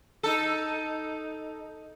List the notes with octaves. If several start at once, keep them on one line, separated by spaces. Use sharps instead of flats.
D#4 A4